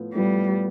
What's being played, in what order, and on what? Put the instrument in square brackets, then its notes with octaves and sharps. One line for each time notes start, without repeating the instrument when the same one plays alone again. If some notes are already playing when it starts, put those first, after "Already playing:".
Already playing: [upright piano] A2 F3 B3
[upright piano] A2 F3 B3 [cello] G3